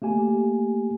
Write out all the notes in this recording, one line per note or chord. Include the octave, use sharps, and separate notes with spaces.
A3 A#3 G4 G#5